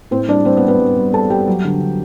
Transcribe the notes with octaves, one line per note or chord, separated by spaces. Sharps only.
A2 C4 C5
G3 D4 D5
G3 C4 C5
B3 B4
G3
B3 B4
G3
G3
G3 A4 A5
G3 G4 G5
F#3
D3
D3